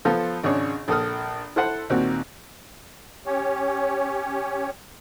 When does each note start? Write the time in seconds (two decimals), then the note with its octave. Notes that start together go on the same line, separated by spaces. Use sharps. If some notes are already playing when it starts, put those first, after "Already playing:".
0.05 F3 B3 F4 A4 C5
0.43 G#1 C#3 D4 G#4 C#5 C#6
0.88 A#1 A4 D#6 F6
1.56 E4 A4 C5 F#5 C6
1.90 D#2 A#2 D#3 C4 F#4
3.26 C#4 G4 C#5